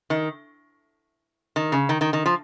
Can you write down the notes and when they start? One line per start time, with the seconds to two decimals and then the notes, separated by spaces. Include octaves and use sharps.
0.10 D#3
1.56 D#3
1.72 C#3
1.89 D#3
2.01 D#3
2.13 D#3
2.26 F3